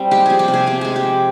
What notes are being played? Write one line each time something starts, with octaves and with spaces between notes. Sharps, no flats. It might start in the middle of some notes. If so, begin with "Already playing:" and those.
Already playing: G3 C4
G#3 G4
F3 G#4
G4
C3
G#4
C4 G4
G#3 G#4
G4
F3